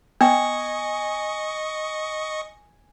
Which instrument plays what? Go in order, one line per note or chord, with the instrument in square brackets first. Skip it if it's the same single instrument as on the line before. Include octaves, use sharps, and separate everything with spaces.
[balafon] B3 G5 [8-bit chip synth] D#5 C#6 [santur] G#5